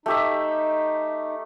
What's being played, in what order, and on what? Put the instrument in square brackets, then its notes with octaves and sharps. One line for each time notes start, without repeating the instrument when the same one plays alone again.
[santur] A3 G4 E5 [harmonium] D#4